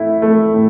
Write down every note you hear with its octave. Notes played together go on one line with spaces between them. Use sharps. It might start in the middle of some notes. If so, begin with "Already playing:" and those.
Already playing: A2 A3 E4
A3
A2